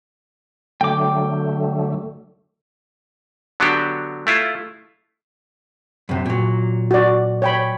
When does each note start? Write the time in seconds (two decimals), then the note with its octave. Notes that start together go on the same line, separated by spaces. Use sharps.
0.81 D3 F#3 A3 G5 D6
3.60 D3 F#3 B3 D4 F#4 G4
4.27 A3 E4 F4
6.09 F#2 C3
6.26 A#2 F#3
6.91 F#4 D5
7.42 C#5 G5 B5